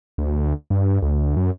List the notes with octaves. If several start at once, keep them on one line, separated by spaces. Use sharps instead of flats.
D2
G2
D2
F#2